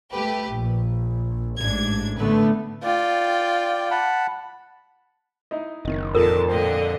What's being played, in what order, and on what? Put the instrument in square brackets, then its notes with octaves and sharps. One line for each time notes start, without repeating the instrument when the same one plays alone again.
[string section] A3 G4 B4
A#1
A1 G#2 D4 G#6
D3 A3 B3 B4
[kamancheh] F4 G5 [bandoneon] D5
[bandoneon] F#5 A5 B5
[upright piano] D#4 E4 D#5
[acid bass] F#1 [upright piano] D#3 D#5
[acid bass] F2 [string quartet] A#2 D3 A5 [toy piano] F4 A4 A#4
[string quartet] A#2 D3 D#5 [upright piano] C5